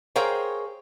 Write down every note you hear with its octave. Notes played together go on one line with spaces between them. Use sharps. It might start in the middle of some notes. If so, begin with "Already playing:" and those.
G#4 A#4 C5 C#5 F5 G5